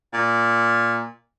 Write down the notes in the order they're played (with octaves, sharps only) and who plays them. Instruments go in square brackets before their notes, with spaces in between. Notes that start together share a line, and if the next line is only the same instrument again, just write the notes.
[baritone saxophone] A#2